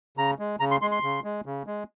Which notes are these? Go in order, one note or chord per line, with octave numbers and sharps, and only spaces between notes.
C#3 A#5
G#3
C#3 A#5
C6
G#3 C6
C6
C#3
G#3
C#3
G#3